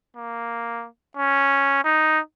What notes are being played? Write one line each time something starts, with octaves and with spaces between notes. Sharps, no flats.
A#3
C#4
D#4